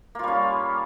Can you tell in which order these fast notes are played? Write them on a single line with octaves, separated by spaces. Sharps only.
A#3 F4 G3 C#4